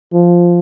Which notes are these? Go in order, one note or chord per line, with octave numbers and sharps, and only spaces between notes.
F3